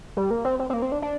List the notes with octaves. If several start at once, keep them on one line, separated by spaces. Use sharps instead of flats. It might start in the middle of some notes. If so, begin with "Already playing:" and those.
G3
A#3
C4
C4
C4
A#3
C4
D4
D4